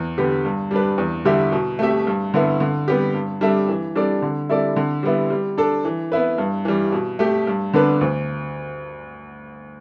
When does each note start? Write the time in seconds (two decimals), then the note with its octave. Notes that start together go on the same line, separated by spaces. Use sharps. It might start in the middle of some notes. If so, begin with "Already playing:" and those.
Already playing: E2
0.18 D3 B3 G4
0.45 G2
0.71 G3 D4 B4
0.98 E2
1.25 D3 G3 E4 G4
1.52 B2
1.79 A3 G4 E5
2.07 G2
2.34 D3 B3 E4
2.60 D3
2.88 G3 B3 G4
3.14 G2
3.41 G3 D4 A4 E5
3.69 E3
3.95 G3 D4 A4 D5
4.22 D3
4.49 G3 E4 A4 D5
4.76 D3
5.03 G3 B3 E4
5.30 G3
5.58 D4 A4
5.85 E3
6.12 B3 E4 B4
6.38 G2
6.65 E3 G3
6.92 B2
7.19 A3 G4
7.47 G2
7.73 D3 B3 D4 B4
8.01 D2